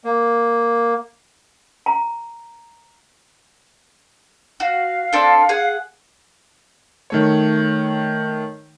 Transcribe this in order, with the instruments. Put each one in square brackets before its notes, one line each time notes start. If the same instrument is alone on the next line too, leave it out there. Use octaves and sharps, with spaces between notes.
[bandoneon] A#3
[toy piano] A#5
[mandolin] F#4 [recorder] F5
[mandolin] C4 D4 A4
G#4 F#5
[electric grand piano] D#3 A3 C#5